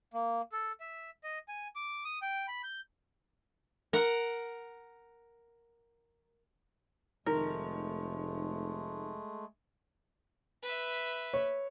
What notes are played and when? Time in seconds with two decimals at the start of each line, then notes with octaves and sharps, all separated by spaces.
0.13 A#3
0.52 A4
0.80 E5
1.23 D#5
1.48 G#5
1.75 D6
2.05 D#6
2.22 G5
2.48 B5
2.64 G6
3.93 A#4 F#5
7.26 F1 D#3 G#3 A3 A#4
10.63 B4 E5
11.34 C#5